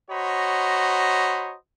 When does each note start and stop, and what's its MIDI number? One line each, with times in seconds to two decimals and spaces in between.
0.10 1.55 66
0.10 1.55 72
0.10 1.55 73
0.10 1.55 75
0.10 1.55 82
0.10 1.55 83